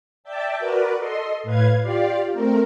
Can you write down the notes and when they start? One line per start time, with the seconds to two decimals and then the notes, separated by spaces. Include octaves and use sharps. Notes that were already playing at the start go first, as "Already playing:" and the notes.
0.24 D5 E5 G5 A5
0.59 F#4 A#4 B4 D5
0.96 A4 D#5 C6
1.43 A2 B4 F5 G#6
1.81 F4 G4 D5 F5
2.31 A3 C4 A#4